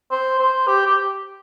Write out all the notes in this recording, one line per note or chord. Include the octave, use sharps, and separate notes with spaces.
C5
C5
G4
G4